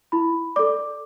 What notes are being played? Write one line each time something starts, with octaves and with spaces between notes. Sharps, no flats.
E4 B5
A4 D5 D6